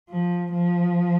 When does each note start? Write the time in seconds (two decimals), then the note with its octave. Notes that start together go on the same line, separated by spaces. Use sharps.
0.09 F3
0.52 F3